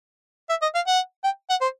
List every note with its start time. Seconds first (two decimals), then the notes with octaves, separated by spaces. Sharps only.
0.49 E5
0.62 D#5
0.75 F5
0.87 F#5
1.24 G5
1.50 F#5
1.61 C5